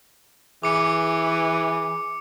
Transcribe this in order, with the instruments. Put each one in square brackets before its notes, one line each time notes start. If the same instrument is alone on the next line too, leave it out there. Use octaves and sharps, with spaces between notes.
[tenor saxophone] E3 [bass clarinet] G#4 [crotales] D6 C#7